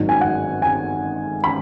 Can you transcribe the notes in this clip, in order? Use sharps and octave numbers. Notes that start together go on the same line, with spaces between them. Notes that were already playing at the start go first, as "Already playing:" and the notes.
Already playing: G#1 G#2 D#3 F#3
G#5
F#5
G#5
B5